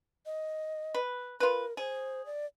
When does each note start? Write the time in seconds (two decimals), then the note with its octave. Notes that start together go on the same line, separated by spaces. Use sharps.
0.26 D#5
0.95 B4
1.40 F4 A#4 B4
1.77 G#4 C5
2.26 D5